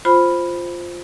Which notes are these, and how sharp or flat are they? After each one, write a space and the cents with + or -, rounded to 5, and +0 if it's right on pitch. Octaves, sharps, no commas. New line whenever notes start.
F4 +0 C5 +0 B5 +0